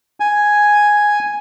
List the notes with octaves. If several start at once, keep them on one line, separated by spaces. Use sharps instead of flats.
G#5